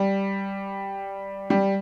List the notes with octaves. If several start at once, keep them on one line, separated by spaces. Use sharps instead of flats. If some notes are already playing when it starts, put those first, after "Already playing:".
Already playing: G3
G3